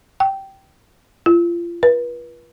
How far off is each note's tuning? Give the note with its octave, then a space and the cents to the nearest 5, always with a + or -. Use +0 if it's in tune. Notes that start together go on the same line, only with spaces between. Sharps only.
G5 -15
F4 -30
B4 -35